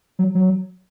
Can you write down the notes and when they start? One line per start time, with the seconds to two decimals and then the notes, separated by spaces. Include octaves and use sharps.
0.19 F#3
0.35 F#3